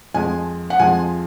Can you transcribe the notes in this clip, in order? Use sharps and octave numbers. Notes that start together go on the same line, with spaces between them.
F2 F3 G#3 G#5
F#5
F2 F3 G#3 G#5